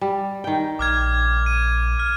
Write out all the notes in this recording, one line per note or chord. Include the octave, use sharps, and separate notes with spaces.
G3
D#3 G5
A#1 D6 F6 G#6
D#7
F6